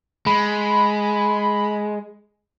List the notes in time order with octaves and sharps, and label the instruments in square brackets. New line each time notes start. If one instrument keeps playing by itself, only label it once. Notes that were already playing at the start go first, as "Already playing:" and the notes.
[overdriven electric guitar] G#3 [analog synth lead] B5